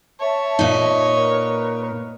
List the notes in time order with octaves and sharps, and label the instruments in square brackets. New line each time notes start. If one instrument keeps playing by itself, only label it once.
[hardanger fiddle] C#5 [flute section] E5 A5
[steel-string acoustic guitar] A#2 D#4
[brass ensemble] A#4 [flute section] B4